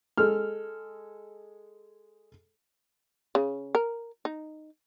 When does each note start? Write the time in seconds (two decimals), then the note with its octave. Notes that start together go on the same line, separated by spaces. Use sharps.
0.18 G#3 A4 F6
3.35 C#3
3.75 A#4
4.25 D#4